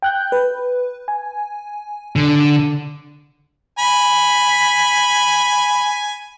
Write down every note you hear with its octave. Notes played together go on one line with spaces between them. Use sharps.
G5 F#6 G6
B4
G#5
D3
G#5 B5